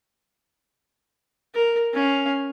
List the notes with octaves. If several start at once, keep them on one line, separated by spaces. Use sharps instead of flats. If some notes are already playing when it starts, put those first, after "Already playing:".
A#4
C#4 F5